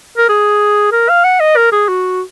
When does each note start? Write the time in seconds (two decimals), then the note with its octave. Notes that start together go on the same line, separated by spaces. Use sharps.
0.17 A#4
0.29 G#4
0.92 A#4
1.09 F5
1.24 F#5
1.40 D#5
1.56 A#4
1.72 G#4
1.88 F#4